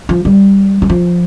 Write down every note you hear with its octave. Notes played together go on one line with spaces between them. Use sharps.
F3
G3
G3
F3